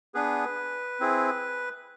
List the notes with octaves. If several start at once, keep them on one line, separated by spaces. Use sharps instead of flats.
B3 D4 G#4 B4
C4 E4 G#4